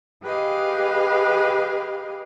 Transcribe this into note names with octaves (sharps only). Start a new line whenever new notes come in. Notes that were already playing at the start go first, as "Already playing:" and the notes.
G4 G#4 B4 D#5 F5